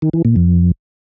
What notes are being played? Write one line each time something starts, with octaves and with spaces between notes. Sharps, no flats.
D#3
E3
A#2
F2